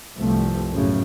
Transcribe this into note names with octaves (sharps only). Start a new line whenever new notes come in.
C2 G2 F3 A3
B1 F#2 A2 C#3